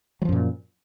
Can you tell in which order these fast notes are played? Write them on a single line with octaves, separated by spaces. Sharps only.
F#3 F3 F#2 A#2